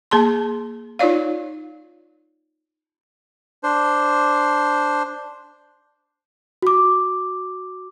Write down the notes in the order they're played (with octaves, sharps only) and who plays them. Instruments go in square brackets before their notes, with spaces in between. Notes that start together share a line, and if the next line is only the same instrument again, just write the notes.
[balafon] A#3 G#4 A5 C6
D#4 F4 C#5 D5 F5
[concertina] D4 C5
[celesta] F#4 D6